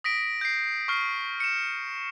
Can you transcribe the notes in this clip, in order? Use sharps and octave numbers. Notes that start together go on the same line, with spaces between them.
D#6 A#6 B6 D7
G6 C7
C#6 F6 C7
C#7 E7